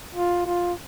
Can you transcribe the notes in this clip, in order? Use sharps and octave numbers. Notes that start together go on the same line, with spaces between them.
F4
F4